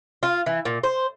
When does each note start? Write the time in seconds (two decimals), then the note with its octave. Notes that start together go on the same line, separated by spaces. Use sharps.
0.23 F4
0.46 E3
0.65 A#2
0.83 C5